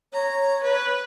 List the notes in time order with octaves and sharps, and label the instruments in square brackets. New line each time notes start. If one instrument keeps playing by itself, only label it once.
[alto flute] C#5 [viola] A#5
[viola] B4